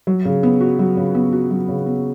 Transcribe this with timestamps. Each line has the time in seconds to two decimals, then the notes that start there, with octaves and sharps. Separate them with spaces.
0.07 F#3
0.25 C#3
0.43 B3
0.61 F#4
0.79 F#3
0.97 C#3
1.15 B3
1.33 F#4
1.50 F#3
1.69 C#3
1.86 B3